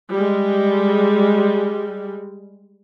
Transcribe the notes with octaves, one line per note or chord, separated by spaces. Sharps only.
G3 G#3